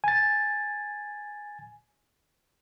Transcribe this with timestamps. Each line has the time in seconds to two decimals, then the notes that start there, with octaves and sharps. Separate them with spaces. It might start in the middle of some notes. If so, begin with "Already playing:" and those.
0.04 G#5 A6